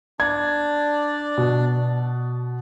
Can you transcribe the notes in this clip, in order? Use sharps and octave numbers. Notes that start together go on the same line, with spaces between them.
D4 D5 G#6
B2